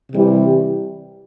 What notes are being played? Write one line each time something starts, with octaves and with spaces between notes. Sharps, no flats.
C3 E3 G3